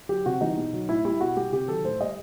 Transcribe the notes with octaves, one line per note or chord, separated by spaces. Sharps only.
F#3 G4
C3 F#4
E3 G3 D#4
B2
F#3
A2 E4
G3 E4
B2 F#4
G3 G4
C3 G4
D#3 F#3 A4
A2 C5
G3 D#5